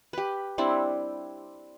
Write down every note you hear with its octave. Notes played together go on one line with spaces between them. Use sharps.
G4 B4
G3 C4 D4 E4